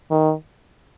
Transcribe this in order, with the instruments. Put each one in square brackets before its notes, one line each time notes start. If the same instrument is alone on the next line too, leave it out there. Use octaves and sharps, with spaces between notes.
[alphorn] D#3